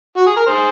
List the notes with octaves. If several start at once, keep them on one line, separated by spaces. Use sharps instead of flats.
F#4
G#4
A#4
G#4 C5